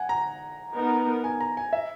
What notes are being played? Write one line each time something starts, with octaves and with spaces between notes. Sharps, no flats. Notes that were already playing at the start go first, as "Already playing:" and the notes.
Already playing: F#5 G#5
A#5
B3 D#4 A#4
G#5
A#5
G#5
E5